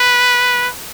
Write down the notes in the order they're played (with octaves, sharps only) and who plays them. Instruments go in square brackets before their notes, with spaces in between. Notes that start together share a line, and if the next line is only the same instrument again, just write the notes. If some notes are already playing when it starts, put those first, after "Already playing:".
Already playing: [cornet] B4